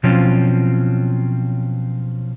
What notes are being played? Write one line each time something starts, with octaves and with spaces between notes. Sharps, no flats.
B2 F3 F#3 C4 C#4 F4